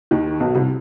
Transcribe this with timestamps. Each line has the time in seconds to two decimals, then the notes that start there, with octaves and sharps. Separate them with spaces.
0.11 D#2 D#3
0.40 B1 B2
0.55 C2 C3